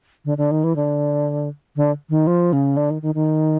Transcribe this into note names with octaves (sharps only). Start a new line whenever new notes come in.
D3
D3
D#3
E3
D3
D3
D#3
F3
C#3
D3
D#3
D#3
D#3